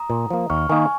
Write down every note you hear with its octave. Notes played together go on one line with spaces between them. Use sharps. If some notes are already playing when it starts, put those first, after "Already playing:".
Already playing: A#5 D#6
A#2
F3 A#3
D#2 C#6 F6
D#3 A#3 D#4 G#5 C#6